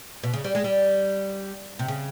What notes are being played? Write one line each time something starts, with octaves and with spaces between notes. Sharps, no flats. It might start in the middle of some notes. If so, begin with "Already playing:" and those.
B2
C#3
G3
G#3
G3
C3
C#3